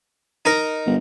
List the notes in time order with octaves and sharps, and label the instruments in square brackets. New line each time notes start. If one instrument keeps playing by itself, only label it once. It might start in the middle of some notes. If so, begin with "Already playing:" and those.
[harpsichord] D#4 A#4
[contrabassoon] G1